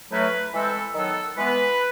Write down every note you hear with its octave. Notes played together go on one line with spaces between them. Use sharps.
A2 F#3 A3 C#4 B4
E3 G#3 C4 A4
D#3 F#3 B3 A4
E3 G#3 B3 B4